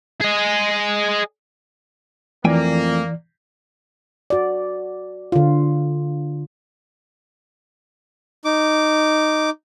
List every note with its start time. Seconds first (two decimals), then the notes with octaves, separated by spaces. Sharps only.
0.21 G#4 D#5
2.45 F2 E3 A3 A#3 D5 G5 G#5
4.30 F#4 D5
5.32 D3 F4
8.45 D#4 D6